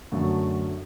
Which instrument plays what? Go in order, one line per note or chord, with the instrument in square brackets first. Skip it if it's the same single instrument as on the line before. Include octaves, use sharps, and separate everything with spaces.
[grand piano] F#2 D3 A3 F#4